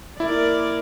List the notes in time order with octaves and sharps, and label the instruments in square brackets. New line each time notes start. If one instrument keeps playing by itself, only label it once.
[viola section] A#3 A#4 D5 [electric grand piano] E4